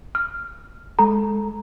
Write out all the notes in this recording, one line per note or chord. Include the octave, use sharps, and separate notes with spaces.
F6
G#3 A4 A#5